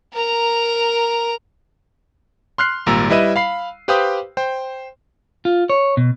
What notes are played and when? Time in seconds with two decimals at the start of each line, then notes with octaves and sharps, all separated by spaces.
0.13 A#4 A#5
2.58 C6 F6 F#6 C7
2.86 G#1 A#2 G3 A#5 E6
3.10 G3 E4 B4 D#5 E5 D#7
3.36 F5 B5 C7
3.88 G4 B4 C5 F5 G5 D#6
4.37 C5 G5
5.45 F4
5.70 C#5
5.97 B2